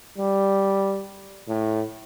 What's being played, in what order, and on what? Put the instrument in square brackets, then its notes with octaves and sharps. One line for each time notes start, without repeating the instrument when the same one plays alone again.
[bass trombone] G3
A2